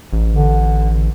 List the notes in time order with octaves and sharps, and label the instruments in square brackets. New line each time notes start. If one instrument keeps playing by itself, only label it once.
[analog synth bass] A1
[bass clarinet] D3